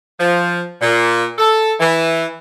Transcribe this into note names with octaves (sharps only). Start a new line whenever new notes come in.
F3
A#2
A4
E3